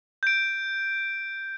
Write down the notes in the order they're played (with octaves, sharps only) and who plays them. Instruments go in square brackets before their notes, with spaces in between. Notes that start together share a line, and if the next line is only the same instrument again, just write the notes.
[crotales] G6 D7